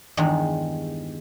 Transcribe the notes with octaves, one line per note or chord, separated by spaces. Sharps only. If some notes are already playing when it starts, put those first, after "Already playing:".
E2 G2 D#3 G#3